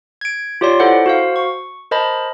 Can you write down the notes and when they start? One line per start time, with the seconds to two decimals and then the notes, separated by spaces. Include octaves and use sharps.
0.21 G#6 D7
0.61 F4 G4 C#5 D5 C6
0.80 E4 A4 C5 F#5
1.06 F#4 C5 F5
1.36 C#6
1.91 A#4 C5 D#5 A5 B5